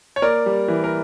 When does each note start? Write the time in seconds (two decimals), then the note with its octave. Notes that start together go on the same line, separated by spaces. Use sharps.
0.16 C#5
0.22 A#3 A#4 D5
0.46 G3
0.68 E3
0.84 A#4